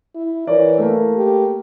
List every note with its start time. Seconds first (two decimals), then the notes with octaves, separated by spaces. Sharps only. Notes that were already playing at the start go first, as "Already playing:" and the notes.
0.15 E4
0.47 E3 A#4 C#5 D5
0.78 A3 A#3
1.16 G4